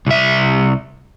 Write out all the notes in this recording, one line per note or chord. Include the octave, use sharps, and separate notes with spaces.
C2 E5